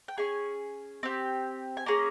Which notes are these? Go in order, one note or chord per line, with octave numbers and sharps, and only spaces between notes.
G5
C#4 G#4 G#5
C4 G4
G#5
A#3 C#4 G#4 A#5